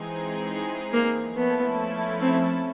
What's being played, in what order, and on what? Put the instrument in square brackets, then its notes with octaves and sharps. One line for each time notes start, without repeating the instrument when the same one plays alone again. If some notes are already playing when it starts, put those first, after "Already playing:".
Already playing: [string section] E3 G#3 C4 D#4 G#4
[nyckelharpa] A#3
[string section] F3 A3 C#4 E4 A4 [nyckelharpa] B3
[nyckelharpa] C4